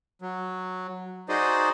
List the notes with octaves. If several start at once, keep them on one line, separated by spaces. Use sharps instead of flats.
F#3
D#4 F#4 G#4 C5 D5 D#5